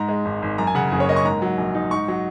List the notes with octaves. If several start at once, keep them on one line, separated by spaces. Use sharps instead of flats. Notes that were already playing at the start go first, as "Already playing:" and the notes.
Already playing: G#2 A#5
G#3
G#1
G#1
F#2 A#5
G#5
C#3 F#5
F#1 G#4
C#5
A#3 D#5
C#6
G#2 A#5
F#3
A#1
D#4
G#2 C#6
F#3